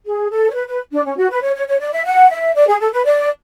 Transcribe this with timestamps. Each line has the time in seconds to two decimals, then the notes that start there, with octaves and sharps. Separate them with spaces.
0.05 G#4
0.31 A4
0.49 C#5
0.55 B4
0.68 B4
0.92 D4
1.05 C#4
1.18 F#4
1.30 B4
1.42 C#5
1.55 C#5
1.68 C#5
1.80 D5
1.92 E5
2.05 F#5
2.30 E5
2.55 D5
2.68 G#4
2.80 A4
2.92 B4
3.05 D5